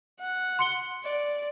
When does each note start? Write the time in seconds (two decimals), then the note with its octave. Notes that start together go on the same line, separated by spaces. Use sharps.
0.20 F#5
0.59 C6 C#7 G7
1.04 D5